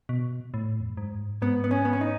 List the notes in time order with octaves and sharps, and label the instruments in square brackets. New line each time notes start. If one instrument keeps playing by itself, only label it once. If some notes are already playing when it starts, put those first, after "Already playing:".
[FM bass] B2
A2
E2
F#2
G#2
[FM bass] G#2 [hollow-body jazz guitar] B3
[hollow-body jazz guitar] B3
C#4
B3
C#4
D#4